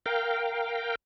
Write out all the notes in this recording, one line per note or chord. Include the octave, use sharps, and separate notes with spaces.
A#4 F5 G5